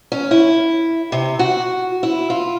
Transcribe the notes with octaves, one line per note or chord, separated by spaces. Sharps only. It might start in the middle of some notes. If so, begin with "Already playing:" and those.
C#4
E4
C3
F#4
E4
F4